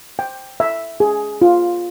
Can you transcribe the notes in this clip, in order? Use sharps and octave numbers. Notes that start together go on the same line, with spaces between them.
G5
E5
G#4
F4